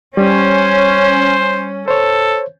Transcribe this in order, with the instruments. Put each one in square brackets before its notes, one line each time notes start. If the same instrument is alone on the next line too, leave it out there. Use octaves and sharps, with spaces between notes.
[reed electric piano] G3 [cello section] C#4 [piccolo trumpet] C5
[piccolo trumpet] A4 [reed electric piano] C5 C#5